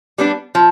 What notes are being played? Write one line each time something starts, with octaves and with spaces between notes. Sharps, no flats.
G3 B3 D4
F3